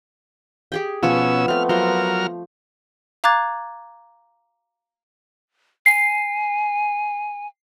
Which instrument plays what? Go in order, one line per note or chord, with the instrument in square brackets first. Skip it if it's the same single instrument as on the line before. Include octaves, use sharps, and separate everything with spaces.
[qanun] G4 G#4 G5
[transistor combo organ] B2 C#4 E6 [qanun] F3 C#5 G#5 [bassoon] B3
[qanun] A3 C4 [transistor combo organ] F6
[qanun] F3 C5 [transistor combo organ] F#3 A#4 F6
[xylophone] F5 A#5 D6 F#6 G#6 A6
[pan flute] G#5 [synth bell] C7